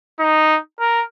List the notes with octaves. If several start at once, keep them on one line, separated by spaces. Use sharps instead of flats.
D#4
A#4